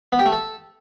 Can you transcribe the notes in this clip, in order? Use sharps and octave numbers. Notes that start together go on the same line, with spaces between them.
B3
G4
A3
A4